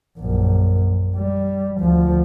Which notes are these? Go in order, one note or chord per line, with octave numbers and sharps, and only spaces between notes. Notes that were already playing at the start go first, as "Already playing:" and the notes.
A#1 F#2
G3
D2 F3